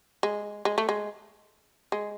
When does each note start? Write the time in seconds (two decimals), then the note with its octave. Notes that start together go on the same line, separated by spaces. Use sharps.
0.23 G#3
0.65 G#3
0.78 A3
0.89 G#3
1.92 G#3